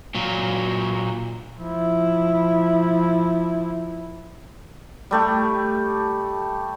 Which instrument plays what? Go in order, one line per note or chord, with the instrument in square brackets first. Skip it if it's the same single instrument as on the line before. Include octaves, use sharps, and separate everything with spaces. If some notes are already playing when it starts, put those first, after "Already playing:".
[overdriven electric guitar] A#2 F#3
[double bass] F3 E4
[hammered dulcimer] G3 A3 G4